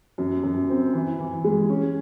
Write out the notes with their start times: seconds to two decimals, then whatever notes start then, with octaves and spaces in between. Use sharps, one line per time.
0.18 F#2
0.43 F#2
0.69 C4
0.93 E3
1.19 E3
1.44 G#3
1.69 C#4